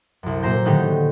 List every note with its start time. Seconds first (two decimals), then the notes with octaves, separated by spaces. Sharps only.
0.23 C2 F#2
0.42 A#2 F#3 C5 A#5 G6
0.65 A2 D3 D#3 D#4 F#4 G4